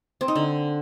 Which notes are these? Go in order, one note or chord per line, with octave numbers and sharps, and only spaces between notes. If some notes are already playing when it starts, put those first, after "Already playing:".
C4
D#4
D3